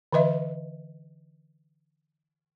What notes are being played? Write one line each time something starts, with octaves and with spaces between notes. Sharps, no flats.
D3 E3 B4 D#5 E5